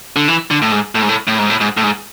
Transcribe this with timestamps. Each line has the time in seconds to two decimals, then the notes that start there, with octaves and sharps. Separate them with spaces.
0.16 D3
0.28 E3
0.51 D3
0.62 A2
0.72 G#2
0.95 A2
1.02 G#2
1.09 A2
1.28 A2
1.39 G#2
1.50 A2
1.61 G#2
1.77 A2
1.83 G#2